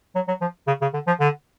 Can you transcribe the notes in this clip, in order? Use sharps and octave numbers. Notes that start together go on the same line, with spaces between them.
F#3
F#3
F3
C#3
C#3
D3
F3
D3